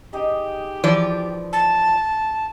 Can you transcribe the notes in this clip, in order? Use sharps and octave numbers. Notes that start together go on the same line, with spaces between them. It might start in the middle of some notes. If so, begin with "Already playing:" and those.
D#4 G4 G#4 D#5
E3 F3 D5
A5